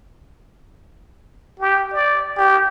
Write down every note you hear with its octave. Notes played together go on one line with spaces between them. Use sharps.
G4
D5
G4